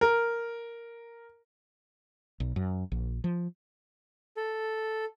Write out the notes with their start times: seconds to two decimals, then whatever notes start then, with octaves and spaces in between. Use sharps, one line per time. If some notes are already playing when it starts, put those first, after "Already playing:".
0.01 A#4
2.40 B1
2.56 F#2
2.92 A#1
3.24 F3
4.37 A4